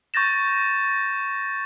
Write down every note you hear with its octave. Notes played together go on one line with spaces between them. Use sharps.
C#6 G6 A6 A#6 E7